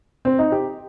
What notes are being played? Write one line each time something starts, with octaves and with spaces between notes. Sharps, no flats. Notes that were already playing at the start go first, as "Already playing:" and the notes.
C4
D#4
G4